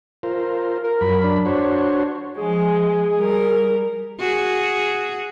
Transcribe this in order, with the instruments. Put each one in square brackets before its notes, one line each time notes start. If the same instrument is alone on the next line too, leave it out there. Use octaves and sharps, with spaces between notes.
[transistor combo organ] F4 A#4 C5
[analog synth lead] A#4
[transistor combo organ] F#2 B5
[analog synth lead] D4
[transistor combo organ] F#4 C5 C#5
[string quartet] F3 G#3 [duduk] G#4
[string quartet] G3 A#4
[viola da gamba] F#4 G#4